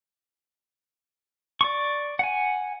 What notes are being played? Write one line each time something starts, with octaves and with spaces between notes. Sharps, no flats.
D5 C#6
F#5 G#5